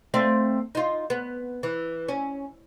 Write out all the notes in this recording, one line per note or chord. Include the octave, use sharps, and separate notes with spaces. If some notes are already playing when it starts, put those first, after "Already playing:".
A3 C4 F5
D#4 F4
B3
E3
C#4